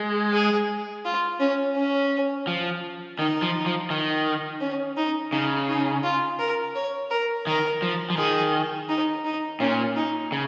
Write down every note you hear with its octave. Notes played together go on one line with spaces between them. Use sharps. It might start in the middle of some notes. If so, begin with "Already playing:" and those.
Already playing: G#3
G#4
F4
C#4
C#4
F3
D#3 D#4
F3
F3
D#3
C#4
D#4
C#3 D#4
D#4
F4
A#4
C#5
A#4
D#3 A#4
F3
F3
D#3 G#4
D#4
D#4
A#2 C#4
D#4
C#3